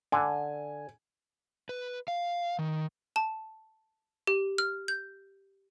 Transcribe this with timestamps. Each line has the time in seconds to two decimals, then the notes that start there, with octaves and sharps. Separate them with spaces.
0.12 D3 G#5
1.69 B4
2.08 F5
2.59 D#3
3.16 A5
4.27 G4
4.58 F6
4.88 G6